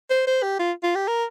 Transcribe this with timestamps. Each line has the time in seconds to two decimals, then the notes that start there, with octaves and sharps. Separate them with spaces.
0.10 C5
0.27 C5
0.43 G4
0.59 F4
0.83 F4
0.95 G4
1.08 A#4